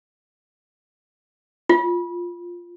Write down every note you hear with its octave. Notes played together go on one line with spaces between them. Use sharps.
F4